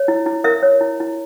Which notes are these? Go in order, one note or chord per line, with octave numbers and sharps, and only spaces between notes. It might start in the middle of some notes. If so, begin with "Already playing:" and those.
Already playing: C#5
E4
E4
A#4 E5
C#5
E4
E4